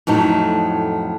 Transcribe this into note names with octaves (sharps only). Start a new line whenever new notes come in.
F2 A2 F#3 D#4